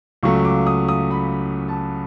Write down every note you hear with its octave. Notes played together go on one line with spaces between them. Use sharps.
C#2 C#3 F#3 A3 C#6
D6
D#6
D#6
B5
A5